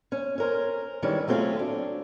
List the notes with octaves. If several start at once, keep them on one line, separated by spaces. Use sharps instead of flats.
C#4
C#4 A#4 C5
D#3 E3 G3 G#3 C#4
F#3 A3 C4 C#4 F4 G#4
D4